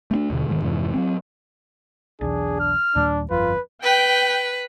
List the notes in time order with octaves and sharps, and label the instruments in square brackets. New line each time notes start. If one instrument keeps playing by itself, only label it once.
[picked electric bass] A3 B3 D4
D#2 B2 D3
E1 G#2 D#3
F2 G#2 C3 E3
F#3 G3 C4
[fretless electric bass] B1 E2 [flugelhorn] D4 [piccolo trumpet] G#4
[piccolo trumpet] F6
[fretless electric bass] D#2 A#2 G3 [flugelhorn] D4
[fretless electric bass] G1 F2 [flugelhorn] F4 [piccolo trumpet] B4
[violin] B4 [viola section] G5